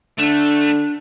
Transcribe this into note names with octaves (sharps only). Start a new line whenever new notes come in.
D3 A3 D4